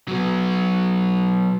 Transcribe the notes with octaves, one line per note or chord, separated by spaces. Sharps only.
F#3 B3